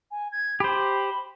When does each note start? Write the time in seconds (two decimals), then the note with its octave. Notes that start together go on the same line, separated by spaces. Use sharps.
0.11 G#5
0.32 G#6
0.60 G4 C5 B5